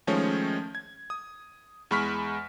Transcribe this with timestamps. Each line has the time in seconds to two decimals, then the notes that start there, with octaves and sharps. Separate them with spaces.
0.07 D#3 F3 G#3 A3 C#4 C#5
0.75 G#6
1.10 D#6
1.91 E2 G#3 B5 C#6 F6 B6